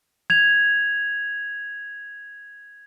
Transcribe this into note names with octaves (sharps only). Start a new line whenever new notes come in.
G#6 F7